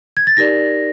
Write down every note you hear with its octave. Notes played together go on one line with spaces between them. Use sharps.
G#6
A6
D#4 G4 A#4 D5 A#6